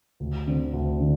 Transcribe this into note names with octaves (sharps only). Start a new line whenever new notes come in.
D2
D3 C4
D2
D3